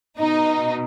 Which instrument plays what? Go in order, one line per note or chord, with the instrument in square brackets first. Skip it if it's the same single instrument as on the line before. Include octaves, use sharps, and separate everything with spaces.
[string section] B2 D#4